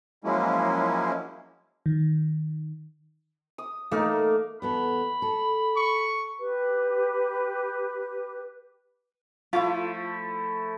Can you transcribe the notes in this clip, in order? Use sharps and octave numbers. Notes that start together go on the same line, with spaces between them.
F3 F#3 G#3 A#3 C#4 E4
D#3
D#6
A3 A#3 D#4 A#4
E2 B3 A4 B5
A4
C#6
G4 B4
F3 A3 E4 F4